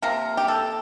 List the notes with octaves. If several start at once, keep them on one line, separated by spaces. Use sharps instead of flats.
C3 F3 A#3 A#4
G4
A4